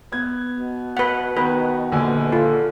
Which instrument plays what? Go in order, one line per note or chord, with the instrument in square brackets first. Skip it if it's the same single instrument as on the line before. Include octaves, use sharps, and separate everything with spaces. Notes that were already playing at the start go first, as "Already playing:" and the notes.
[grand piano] B3 G#6
[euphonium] B2
[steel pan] B4 F#5
[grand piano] D#3 B3 [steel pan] B4
[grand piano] A#1 D3 G#5
[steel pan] F4 [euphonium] A4